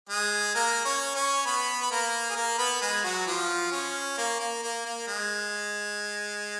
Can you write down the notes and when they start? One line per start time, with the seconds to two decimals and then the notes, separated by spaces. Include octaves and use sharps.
0.09 G#3 G#4
0.55 A#3 A#4
0.85 C#4 C#5
1.15 C#4 C#5
1.46 B3 B4
1.82 B4
1.91 A#3 A#4
2.30 G#4
2.36 A#3 A#4
2.58 B3 B4
2.81 G#3 G#4
3.04 F#3 F#4
3.27 F3 F4
3.72 C#4
4.18 A#3
4.40 A#3
4.63 A#3
4.85 A#3
5.08 G#3